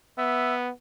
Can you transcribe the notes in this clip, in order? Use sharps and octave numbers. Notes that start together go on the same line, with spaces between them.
B3 E5